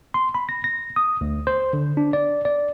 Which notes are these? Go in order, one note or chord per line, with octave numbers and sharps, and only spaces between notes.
C6
B5
A#6
A#6
D#6
D2
C5
D3
D4
D5
D5